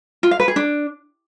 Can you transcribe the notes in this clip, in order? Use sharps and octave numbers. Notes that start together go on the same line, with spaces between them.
F4
F5
B4
G#4
D4